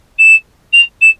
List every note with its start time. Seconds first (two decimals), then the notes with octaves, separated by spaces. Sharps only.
0.18 E7
0.73 F7
1.01 E7